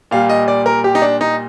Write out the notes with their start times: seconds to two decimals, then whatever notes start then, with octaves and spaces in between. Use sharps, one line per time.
0.11 A#2 G3 F5
0.29 D#5
0.48 D5
0.66 A#4
0.84 G4
0.95 D#4
1.02 D4
1.21 D#4